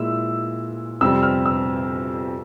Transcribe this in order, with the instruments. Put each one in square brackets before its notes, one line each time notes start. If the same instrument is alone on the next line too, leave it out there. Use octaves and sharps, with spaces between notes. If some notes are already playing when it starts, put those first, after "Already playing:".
Already playing: [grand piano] A#2 G#3 E4 [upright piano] E6
[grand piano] F2 C3 G3 C4 [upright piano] E6
[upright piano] F6
E6